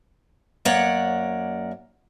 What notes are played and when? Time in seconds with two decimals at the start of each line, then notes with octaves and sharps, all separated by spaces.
0.65 F#2 A#3 C#5 D5 F#5